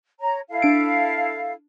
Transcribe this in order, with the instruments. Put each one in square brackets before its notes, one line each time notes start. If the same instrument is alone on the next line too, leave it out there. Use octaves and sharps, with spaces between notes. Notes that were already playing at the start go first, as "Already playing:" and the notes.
[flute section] C#5 A#5
E4 A4 F5
[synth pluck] D4 D7